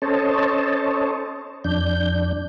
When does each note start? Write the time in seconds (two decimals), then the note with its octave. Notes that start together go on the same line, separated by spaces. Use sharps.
0.02 C#4 A4 C5 C#5 D#5 A5
1.64 F2 D4 G6